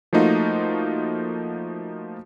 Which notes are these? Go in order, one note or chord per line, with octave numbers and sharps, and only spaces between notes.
F3 A3 A#3 D#4 F4 F#4